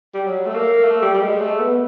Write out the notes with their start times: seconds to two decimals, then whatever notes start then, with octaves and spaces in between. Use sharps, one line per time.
0.14 G3
0.26 F#3
0.46 A3
0.55 A#3
0.84 A3
1.02 G3
1.14 G3
1.21 G#3
1.41 A3
1.60 B3